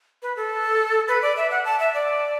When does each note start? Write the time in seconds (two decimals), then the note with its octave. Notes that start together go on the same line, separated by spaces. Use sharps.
0.22 B4
0.37 A4
1.08 B4
1.22 D5
1.37 E5
1.51 F#5
1.65 A5
1.80 E5
1.94 D5